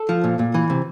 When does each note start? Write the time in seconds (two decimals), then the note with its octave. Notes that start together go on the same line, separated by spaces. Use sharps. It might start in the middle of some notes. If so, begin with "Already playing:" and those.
Already playing: A4
0.09 F3
0.24 A#2
0.39 A#2
0.54 E3
0.70 C3